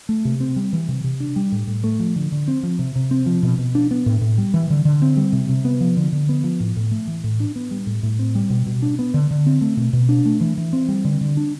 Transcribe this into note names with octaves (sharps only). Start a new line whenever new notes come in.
A3
C3
C4
G3
E3
C3
C3
D4
G3
A2
A2
A3
F3
D3
D3
C4
F3
C3
C3
C4
F3
B2
B2
D4
B3
A2
A2
G3
E3
D3
D3
C4
G3
C3
C3
B3
F3
D3
D3
B3
F3
A2
A2
A3
E3
A2
D4
B3
G3
A2
A2
C4
G3
B2
B2
D4
B3
D3
D3
C4
A3
B2
B2
D4
A3
E3
E3
C4
G3
D3
D3
D4